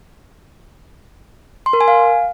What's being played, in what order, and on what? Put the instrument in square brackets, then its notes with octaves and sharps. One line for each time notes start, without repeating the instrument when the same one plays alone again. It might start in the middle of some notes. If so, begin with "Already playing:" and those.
[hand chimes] C6
A#4
G#5
F5